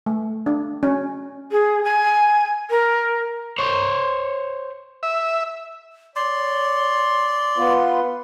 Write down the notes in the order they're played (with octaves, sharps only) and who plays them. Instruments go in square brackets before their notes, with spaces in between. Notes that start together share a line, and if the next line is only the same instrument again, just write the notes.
[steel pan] A3
D4
C#4
[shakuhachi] G#4
G#5
A#4
[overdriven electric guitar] C5 C#5
[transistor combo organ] E5
[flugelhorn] C#5 [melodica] D5 [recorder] C6
[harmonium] B3 F4 [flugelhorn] B4